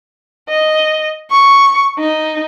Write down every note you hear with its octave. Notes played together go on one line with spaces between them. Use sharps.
D#5
C#6
D#4